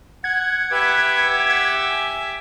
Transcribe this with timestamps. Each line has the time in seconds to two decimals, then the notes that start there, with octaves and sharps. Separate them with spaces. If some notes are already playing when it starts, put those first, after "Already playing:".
0.24 F#5 G#6
0.71 G4 B4 E5 F#5
1.49 F#5 E6
1.90 G#5